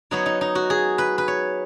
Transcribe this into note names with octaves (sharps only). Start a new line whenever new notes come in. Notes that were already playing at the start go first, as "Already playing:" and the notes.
F#3 B3 D#4 C#5
D#4
D#4
F#4
G#4
B4
B4
C#5